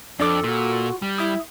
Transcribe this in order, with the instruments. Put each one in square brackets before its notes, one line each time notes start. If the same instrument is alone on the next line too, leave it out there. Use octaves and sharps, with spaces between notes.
[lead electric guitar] F2 [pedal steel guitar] D4 D5 D6 [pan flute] A4
[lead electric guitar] A#2 [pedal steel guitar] F4 F#4
[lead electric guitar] G3
[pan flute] E4 [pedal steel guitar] E5 D#6